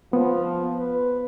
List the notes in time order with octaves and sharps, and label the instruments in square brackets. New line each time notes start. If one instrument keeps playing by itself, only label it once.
[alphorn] F3 [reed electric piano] B3
[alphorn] B4